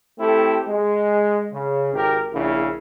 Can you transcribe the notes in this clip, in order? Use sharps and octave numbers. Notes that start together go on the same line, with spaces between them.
A3 C4 E4 G4 A4
G#3
C#3
G#1 G4 A#4
A#1 A#2 C#3 E4